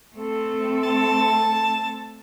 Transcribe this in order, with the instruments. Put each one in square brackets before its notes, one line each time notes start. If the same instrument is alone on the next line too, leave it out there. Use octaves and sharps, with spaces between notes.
[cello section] A3 C4 A4
[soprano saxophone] A5